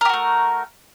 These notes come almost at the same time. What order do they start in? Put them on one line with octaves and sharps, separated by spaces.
A#4 G4 F#4 A3